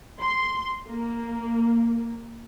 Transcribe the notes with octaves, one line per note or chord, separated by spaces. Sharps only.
C6
A#3